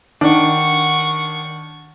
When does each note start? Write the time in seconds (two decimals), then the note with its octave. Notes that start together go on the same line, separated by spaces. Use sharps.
0.21 D#3 D4 F#5 C#6